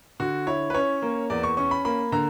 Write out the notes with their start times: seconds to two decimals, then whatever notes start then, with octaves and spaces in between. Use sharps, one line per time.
0.20 D3 F#4
0.47 E4 C#5
0.70 B4
0.74 C#4 C#5
1.02 A#3
1.30 E2 D5
1.43 C#6
1.57 C#4 C#6
1.71 B5
1.85 A#3 B5
2.12 D3 A#5